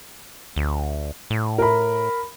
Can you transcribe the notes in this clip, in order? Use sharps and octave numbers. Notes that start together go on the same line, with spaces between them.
D2
A2
A#4 B5